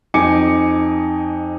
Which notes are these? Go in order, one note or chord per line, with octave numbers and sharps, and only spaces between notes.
F2 D#4 G#5 D6 C#7